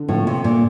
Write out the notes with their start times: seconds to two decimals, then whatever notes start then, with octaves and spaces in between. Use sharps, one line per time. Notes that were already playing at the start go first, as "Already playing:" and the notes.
Already playing: D3
0.09 A2 F3
0.27 C3
0.44 A#2